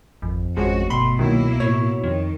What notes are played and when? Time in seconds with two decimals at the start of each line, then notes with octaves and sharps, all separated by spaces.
0.22 G#1 F2
0.57 G#1 F3 G#3 C#4 F#4
0.90 G1 B2 A3 B5 C6
1.19 C2 D#3 F#3 A#3 E4
1.60 A2 C#5
2.04 F2 D#3